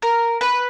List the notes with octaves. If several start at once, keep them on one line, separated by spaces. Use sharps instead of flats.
A#4
B4